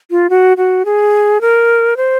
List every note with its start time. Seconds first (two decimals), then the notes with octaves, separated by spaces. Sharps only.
0.11 F4
0.30 F#4
0.57 F#4
0.85 G#4
1.41 A#4
1.97 C5